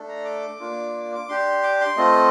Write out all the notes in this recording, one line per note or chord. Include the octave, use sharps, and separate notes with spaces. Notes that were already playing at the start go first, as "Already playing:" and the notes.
Already playing: A3 D4 A4
A#5
D6
A#3 D4 F4
D6
D4 G4 C6
D6
C6
A3 C4 F4 A4 D#5